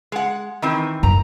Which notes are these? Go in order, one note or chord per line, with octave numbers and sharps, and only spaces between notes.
G#3 F#5
D#3 E3 C4
F#2 A#5